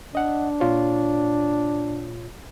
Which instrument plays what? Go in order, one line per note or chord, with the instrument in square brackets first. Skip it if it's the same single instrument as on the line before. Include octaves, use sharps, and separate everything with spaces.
[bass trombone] D4 [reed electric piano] D#5 F#5
[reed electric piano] A#2 F4 C#5